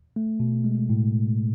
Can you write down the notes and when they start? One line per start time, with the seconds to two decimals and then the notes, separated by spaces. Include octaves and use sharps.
0.16 A3
0.40 B2
0.64 G#3
0.90 A2